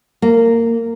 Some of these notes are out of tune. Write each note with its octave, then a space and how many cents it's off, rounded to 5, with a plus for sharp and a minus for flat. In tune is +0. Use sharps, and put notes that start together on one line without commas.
A#3 -20